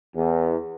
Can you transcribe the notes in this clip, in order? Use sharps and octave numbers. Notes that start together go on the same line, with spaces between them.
E2